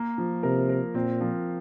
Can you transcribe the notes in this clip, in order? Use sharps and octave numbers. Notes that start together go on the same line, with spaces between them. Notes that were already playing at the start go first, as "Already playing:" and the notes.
Already playing: A#3
F3
C3 A#4
A#4
A#2 C4
F3